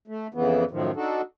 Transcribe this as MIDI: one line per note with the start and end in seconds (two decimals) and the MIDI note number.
0.08 0.27 57
0.34 0.65 41
0.34 0.65 49
0.34 0.65 52
0.34 0.65 59
0.71 0.92 42
0.71 0.92 45
0.71 0.92 51
0.71 0.92 53
0.96 1.22 62
0.96 1.22 63
0.96 1.22 66
0.96 1.22 69